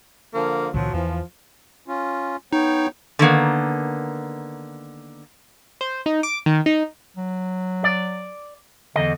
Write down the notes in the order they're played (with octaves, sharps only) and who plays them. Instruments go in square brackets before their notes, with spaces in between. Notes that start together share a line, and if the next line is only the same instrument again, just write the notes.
[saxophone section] D3 F3 A#3
[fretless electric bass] C#2 A#2 D#3 [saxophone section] F3 F#3
[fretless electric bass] E2 [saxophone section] E3 F3
[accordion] C#4 F4
[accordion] B3 C#5 G5 [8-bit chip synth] D#4
[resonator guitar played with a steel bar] D3 D#3 A#3 B3
[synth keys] C5
D#4
D6
D#3
D#4
[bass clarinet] F#3
[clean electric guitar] D5
[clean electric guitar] E2 D#5 [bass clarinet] D3